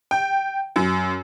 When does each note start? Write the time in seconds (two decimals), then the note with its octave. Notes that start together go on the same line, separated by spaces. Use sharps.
0.11 G5
0.76 F#2